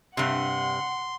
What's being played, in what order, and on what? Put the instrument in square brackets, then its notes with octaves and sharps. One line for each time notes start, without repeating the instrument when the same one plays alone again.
[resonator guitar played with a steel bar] G2 C3 [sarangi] F#5 [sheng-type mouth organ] C6